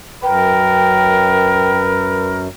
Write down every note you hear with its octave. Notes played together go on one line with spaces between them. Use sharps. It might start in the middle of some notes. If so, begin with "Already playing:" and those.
F#2 A#4 B4 G5